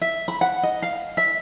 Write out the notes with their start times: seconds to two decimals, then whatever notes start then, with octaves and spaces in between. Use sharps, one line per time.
0.01 E5
0.28 B5
0.41 F#5
0.63 D#5
0.82 F5
1.17 E5